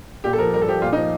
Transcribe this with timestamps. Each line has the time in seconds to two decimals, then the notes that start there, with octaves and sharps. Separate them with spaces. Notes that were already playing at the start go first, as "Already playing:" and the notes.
0.24 A#2 G4
0.33 A4
0.38 F3 A#4
0.54 G2 A#4
0.61 A4
0.68 F3 G4
0.82 A#2 F4
0.93 D#4
0.97 F3